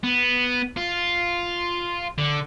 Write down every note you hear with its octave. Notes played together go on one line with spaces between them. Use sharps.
B3
F4
D3